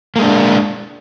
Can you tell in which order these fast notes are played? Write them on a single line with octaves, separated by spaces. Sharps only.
A#3 G#3 D4